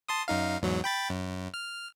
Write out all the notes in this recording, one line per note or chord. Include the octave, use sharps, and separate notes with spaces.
A5 C6 D#6
F#2 D#4 F5
E2 G#2 F#3
G5 B5 A6
F#2
F6